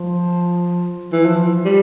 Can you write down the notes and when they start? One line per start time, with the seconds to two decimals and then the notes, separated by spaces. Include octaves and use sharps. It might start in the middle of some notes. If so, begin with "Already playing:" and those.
Already playing: F3
1.13 E3
1.26 F3
1.65 G3